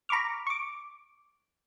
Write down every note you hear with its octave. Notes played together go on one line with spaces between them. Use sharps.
A#5 B5 C#6 D6 F6
C#6 D6